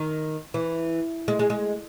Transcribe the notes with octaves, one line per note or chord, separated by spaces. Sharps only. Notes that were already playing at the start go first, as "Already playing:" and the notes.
Already playing: D#3
E3
G#3
G#3
G#3